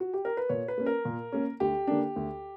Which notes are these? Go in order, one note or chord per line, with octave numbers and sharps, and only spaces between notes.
F#4
G4
A#4
B4
A#2 C#5
B4
A#3 C#4
A#4
A#2
A#3 C#4
D2 G4
D3 A#3 D4
D2